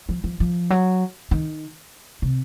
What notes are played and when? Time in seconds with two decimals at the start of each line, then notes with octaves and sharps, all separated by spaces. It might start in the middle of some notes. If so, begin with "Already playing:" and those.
0.09 F3
0.24 F3
0.40 F3
0.70 F#3
1.31 D#3
2.22 C3